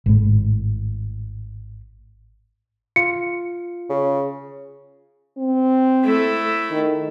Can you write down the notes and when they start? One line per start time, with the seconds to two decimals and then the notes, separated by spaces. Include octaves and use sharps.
0.06 G#1 A2
2.96 F4 C#7
3.89 C#3
5.38 C4
6.04 A3 E4
6.71 D#3